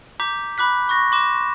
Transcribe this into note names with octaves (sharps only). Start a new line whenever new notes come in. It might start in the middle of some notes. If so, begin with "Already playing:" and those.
A#5 D6 G6 B6
B5 D6 F#6 B6
C#6 F#6 A#6
C6 D6 E7